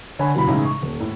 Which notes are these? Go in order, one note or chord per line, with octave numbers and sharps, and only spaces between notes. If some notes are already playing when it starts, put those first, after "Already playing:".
D3 C#5 G#5 B5
F#1 B2 E3 B5
A2 C#3 E3 G#3 D#4 E4
C#6
D#1
A2